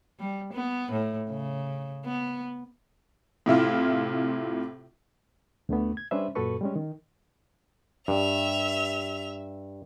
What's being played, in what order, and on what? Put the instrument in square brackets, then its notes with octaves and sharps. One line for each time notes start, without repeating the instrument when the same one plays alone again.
[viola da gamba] G3
B3
A2
C#3
B3
[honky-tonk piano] A2 C3 E4 F4
[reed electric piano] D2 D3 A3 B3
G#6
G3 C#4 D4 B4 C5 E5
F#2 A#2 F#4 A4 B4 C#6
G3 G#3 C#4
D#3
[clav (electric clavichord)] G2 [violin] E5 F7